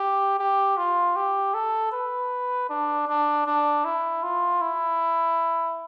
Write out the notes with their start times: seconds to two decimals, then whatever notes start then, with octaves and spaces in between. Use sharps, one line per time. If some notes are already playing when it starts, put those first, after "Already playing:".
Already playing: G4
0.39 G4
0.77 F4
1.16 G4
1.54 A4
1.93 B4
2.70 D4
3.08 D4
3.47 D4
3.85 E4
4.23 F4
4.62 E4